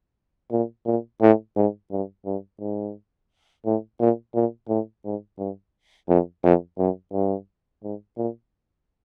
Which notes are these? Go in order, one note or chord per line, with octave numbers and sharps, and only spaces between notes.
A#2
A#2
A2
G#2
G2
G2
G#2
A2
A#2
A#2
A2
G#2
G2
F2
F2
F#2
G2
G#2
A#2